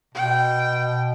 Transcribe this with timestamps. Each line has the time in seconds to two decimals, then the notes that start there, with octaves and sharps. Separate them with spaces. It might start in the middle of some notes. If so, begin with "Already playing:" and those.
0.15 B2 G5